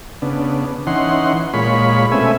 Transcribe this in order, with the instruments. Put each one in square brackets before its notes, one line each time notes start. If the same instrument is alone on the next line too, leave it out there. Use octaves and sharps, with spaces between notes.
[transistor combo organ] C#3 B3 D4
E3 C#4 D#4 F#5 C6
A#2 G#3 F4 C#5 B5
B2 A3 C4 C#4 E5 G#5